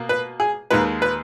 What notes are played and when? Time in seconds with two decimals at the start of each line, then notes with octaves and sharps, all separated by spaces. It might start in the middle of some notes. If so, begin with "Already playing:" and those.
Already playing: B2 A#3
0.09 B4
0.40 G#4
0.71 D#2 D#3 G#3 B4
1.02 B4